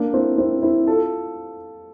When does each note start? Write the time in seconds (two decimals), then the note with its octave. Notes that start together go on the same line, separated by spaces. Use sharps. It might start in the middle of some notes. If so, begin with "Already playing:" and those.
Already playing: A#3 D4
0.13 C4 E4
0.38 C4 E4
0.62 C4 E4
0.87 F4 A4